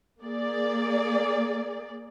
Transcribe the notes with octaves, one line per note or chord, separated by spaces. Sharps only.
A#3 G#4 D5